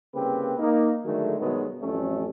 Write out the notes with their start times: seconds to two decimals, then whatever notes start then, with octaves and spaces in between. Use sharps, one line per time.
0.14 C2 C#3 A#3 C4 G4 B4
0.58 A#3 D#4
1.05 D3 D#3 F#3 G#3 A3
1.39 G2 B2 D#3 F#3 G#3 B3
1.81 A1 F2 G3 A3 C#4